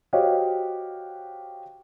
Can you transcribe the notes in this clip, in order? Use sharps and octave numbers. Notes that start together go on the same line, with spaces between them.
F#4 G4 C5 C#5 D#5 F5